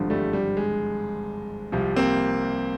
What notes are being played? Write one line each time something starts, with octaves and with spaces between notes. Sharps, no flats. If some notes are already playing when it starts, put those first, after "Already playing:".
Already playing: G#1 G2 D3 F3
G3 A3
G3
G#3
C2 C3 F3
A#3 C4